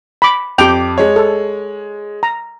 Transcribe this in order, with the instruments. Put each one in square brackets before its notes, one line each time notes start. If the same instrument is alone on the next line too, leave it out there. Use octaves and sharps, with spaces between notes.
[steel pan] B5 D6
[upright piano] F2 D6 F7 [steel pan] G4 G5
[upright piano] G#3 C#5
[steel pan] A4
A#5